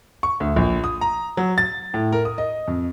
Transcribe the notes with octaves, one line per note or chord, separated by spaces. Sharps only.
C#6
D2
A#1
D#6
A#5
F#3
A6
A2
A#4
D#6
D#5
F2